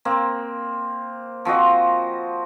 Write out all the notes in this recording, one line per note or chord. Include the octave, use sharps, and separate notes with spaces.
A#3 C4
F3 C4 F#4 D#5